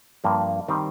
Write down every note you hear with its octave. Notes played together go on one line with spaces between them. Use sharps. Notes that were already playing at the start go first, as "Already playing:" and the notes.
G2 F3 A#3
D#3 G3 C4